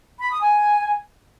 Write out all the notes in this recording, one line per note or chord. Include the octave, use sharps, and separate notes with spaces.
B5
D#6
G#5